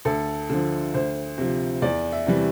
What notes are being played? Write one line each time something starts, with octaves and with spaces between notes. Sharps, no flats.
D2 A4
D3 F3
D2 C5
C3 F3
E2 D5
E5
C3 E3 G3